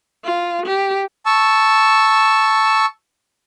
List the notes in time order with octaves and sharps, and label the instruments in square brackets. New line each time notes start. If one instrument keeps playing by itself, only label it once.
[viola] F4
G4
[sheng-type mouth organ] A5 C#6 E6